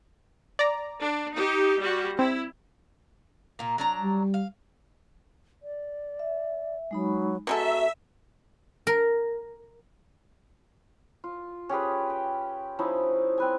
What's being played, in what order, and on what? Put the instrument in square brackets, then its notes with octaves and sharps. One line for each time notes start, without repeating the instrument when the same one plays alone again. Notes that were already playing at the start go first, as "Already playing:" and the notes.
[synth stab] D5 A#5
[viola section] D4
D#4 G4
G3 F#4
[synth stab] C4 [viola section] E4
[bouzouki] A#2 A#3
F#3 D4 A#5
[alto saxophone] G3
[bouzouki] F5
[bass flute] D5
[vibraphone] E5
[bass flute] F#3 [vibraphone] G#3 D#4 B5
[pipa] B2 G#3 A4 [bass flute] F#4 [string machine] E5 [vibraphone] A#5
[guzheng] A#4
[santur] F4
C#4 G4 G#4 B4
G5
F3 C#4 D#4 E4
C4 B4 G#5